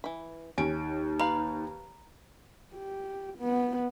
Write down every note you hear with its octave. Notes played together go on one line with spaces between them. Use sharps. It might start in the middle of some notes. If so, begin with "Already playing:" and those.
E3 B5
D#2 C#4 D#4 D7
B4 F5 A#5 B5
G4
B3